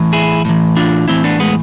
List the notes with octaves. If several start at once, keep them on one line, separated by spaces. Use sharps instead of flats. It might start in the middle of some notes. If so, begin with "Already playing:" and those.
Already playing: A2 E3
E4 G#4
A2 E3
D4 F4
A2 E3 C4 E4
B3 D4
G#3 B3